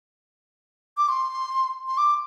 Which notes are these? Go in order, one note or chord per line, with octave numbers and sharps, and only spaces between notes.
D6
C6
C6
D6